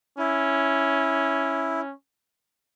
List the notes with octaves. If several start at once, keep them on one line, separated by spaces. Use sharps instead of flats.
C#4 E4